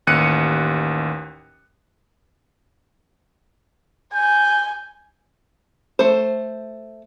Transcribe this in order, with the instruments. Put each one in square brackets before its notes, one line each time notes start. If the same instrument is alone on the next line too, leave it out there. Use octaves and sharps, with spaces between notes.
[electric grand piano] A1 D#2 F#6 C#7 D#7
[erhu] G#5 [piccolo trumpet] G6
[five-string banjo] A3 C5